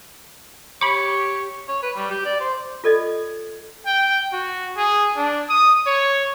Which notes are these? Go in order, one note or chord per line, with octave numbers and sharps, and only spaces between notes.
G4 C#5 B5 D6 C#7
C#5
B4
G3
G4
D5
C5
F4 A4 D5 D#5
G5
F#4
G#4
D4
D#6
C#5